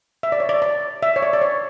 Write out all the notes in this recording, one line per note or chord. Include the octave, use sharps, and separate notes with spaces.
E5
D5
C#5
D5
D5
E5
C#5
D5
D5
C#5